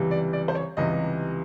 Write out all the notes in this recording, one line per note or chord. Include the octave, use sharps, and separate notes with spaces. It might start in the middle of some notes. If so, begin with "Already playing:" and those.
Already playing: C#2 C3 E3 G3
D5
D5
C5
C#5
C#2 C3 E3 G3 D#5